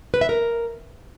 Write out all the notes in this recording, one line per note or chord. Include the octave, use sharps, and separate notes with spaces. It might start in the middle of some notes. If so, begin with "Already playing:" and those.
B4
E5
A#4